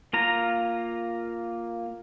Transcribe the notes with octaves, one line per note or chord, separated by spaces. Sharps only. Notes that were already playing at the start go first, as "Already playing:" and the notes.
A#3 F4 A#5